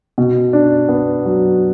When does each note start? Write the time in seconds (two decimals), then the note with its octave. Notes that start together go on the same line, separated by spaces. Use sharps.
0.18 B2
0.53 D4
0.89 B3
1.26 F#3